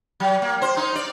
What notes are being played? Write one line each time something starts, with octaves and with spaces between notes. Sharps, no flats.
F#3
A#3
C5
D#4
D5